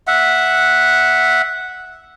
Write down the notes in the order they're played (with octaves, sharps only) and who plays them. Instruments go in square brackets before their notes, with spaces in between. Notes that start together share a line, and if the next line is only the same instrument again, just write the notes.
[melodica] E5 F#5